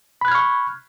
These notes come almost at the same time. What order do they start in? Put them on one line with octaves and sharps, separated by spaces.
B5 F#6 G#6 F6 C#6